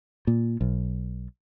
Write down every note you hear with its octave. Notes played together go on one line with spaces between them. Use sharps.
A#2
B1